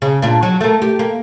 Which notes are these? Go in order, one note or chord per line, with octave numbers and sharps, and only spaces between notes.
C#3
A#2 D4
F#3
A3 A#3
G4
A#3